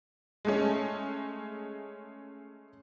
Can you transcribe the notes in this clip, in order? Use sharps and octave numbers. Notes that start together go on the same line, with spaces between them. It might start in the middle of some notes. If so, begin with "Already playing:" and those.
G#3 A3 C#4